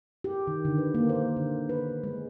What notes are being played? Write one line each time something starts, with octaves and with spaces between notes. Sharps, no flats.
G4
D#3
D3
B4
A#3
C5
D3
B4
G#3